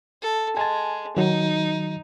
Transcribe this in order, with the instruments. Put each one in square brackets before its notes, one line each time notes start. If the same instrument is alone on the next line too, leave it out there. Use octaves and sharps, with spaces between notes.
[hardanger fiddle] A4
[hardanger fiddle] G#3 [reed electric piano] G#5 A5
[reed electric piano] D#3 F#3 [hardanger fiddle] D#4